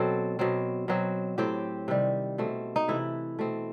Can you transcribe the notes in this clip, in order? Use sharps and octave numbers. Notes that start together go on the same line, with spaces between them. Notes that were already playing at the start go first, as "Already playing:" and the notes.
Already playing: B2 F#3 C4 A4
B2 F#3 C4
B2 F#3 C4
A2 F#3 C4 G4
C3 D#3 G3
B2 A3 C4
D#4
C3 E3 A3 E4
B2 A3 C4